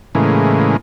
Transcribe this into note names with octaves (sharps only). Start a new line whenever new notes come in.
A2 C#3 E3 G#3 A#3